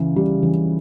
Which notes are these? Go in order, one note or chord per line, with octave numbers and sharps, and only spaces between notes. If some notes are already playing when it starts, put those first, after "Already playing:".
Already playing: C#2 C#3 E3
G3
E3